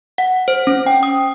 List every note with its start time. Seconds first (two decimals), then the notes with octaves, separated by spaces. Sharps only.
0.18 F#5
0.48 C5
0.67 C#4
0.87 G5
1.03 D#6